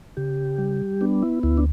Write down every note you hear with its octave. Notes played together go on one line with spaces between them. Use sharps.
C#3 G4
G3
B3 D4
E4
D2 E4
D4